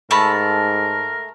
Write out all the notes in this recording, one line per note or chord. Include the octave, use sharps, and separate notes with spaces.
G#2 A3 A#4 A5 B5